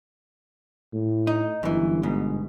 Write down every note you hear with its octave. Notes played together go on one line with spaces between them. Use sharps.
A2
D#4
G1 F#2 E3
G#2 B2